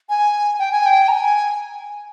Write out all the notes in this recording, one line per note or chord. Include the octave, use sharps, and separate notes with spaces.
G#5
G5
G#5
G5
A#5
G#5